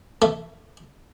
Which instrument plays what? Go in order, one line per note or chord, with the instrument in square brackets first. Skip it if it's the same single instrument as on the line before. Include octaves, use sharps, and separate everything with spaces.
[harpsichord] A3